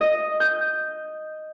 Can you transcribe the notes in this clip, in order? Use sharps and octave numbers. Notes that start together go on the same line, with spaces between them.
D#5
G6